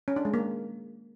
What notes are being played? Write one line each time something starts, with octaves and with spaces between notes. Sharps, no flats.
C#4
D4
G#3
A#3